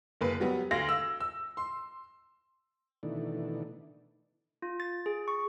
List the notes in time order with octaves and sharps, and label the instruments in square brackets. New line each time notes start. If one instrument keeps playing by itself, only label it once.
[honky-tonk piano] F#1 A#3 B4
F#3 G3 B3
D2 F5 A#6
E6
E6
C6
[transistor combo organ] B2 D#3 E3 A3 D4
[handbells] F4
A6
G#4
C#6